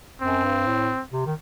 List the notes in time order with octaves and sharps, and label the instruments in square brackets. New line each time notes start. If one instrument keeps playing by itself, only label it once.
[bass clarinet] F#2 [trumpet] C4
[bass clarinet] G2
A2
C3
D#3